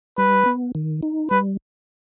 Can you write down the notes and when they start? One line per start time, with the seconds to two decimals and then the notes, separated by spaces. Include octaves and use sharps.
0.18 G3 B4
0.46 B3
0.75 D#3
1.03 D#4
1.31 G3 B4